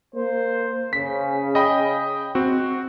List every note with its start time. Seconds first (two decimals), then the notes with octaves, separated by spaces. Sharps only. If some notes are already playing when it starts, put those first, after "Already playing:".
0.15 A#3 C5
0.93 C#3 B6
1.55 D#5 G5 B5
2.35 C4 F#4